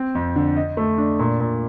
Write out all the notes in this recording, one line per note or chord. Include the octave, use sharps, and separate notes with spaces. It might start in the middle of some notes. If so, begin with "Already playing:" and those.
Already playing: C4
F2
D3
D#5
A3
D4
A#2
A#2